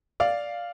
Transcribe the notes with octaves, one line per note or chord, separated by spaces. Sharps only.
D5 F5